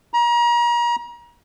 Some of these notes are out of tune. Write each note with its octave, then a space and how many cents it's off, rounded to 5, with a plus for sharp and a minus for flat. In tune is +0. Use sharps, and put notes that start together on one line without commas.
A#5 +35